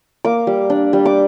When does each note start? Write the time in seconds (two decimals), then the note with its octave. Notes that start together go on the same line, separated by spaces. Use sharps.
0.25 A#3 D6
0.47 G3
0.70 D4
0.93 G3
1.06 D6